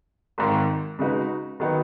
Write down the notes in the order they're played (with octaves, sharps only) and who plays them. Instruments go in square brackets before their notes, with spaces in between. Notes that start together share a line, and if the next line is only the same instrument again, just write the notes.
[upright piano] G#1 G#2 D#3
C#3 G#3 D#4 F#4 B4
D#3 F#3 B3 D#4